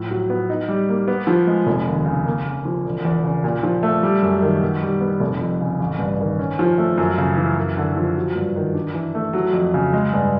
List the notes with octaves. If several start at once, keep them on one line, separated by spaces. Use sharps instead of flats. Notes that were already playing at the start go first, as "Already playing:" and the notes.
Already playing: A2 F3
F#3
B3
D#4
G3
A#3
B3
F3
G#3
F1
D#2
C#3
A#3
C#3
F3
E1
E2
C#3
A#2
F3
A3
G3
F#2
D#3
B2
G3
B3
F1
F2
C#3
A1
G2
D#3
C#4
F3
A3
F#2
C#3
E3
F#2
D3
F3
F#3
G2
D#3
D4
E3
A3
F#3
F2
C#3
G#3
G2